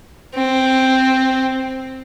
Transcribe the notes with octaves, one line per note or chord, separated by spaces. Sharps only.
C4